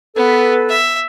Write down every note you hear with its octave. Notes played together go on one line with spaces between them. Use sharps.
B3 A4 B4
E5